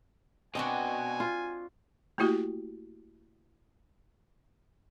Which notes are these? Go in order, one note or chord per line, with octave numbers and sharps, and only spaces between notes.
B2 C4 D4 F#4 D#5 G#5
F4
A3 A#3 E4 F#4 G4